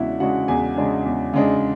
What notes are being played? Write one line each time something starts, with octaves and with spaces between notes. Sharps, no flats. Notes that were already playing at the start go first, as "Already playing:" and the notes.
Already playing: E2 C#3 G#3 D4 E4 F#4 E5 F#5
C#3 G#3 D4 F#4 F#5
E2 G#4 G#5
C#3 G#3 D4
E2
C#3 G#3 D4